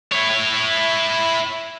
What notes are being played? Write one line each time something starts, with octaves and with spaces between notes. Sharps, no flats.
E4 C#5